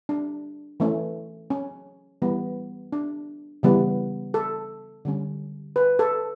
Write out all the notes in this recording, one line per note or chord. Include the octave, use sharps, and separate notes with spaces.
D4
E3 A3 C#4
C#4
E3 G3 B3
D4
C#3 E3 G3 B3
A4
D3 G3 C#4
B4
A4